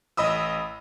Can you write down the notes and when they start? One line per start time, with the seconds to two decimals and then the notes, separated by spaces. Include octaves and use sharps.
0.17 A1 D#5 B5 D#6 E6